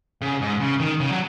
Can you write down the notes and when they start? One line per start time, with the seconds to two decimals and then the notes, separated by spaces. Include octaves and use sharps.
0.22 C#3
0.41 G#2
0.60 C#3
0.80 D#3
1.00 C#3
1.10 F#3